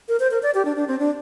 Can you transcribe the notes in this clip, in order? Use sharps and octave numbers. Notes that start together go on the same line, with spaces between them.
A#4
C5
A#4
D5
G4
D4
D4
C4
D4